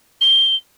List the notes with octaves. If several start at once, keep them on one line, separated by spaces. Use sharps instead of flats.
G7